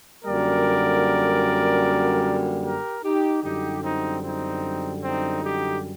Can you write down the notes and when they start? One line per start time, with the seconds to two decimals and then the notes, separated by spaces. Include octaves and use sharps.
0.23 F#2 D3 G3 A#3 A#4 D5
2.63 G4 A#4
3.03 D#4 G4
3.42 F#2 D3 G3 D#4 G4
3.83 C4 D#4
4.22 C4 D#4
5.03 C4 D#4
5.42 D#4 G4